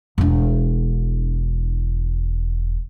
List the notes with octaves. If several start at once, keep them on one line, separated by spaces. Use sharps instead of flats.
E1 D4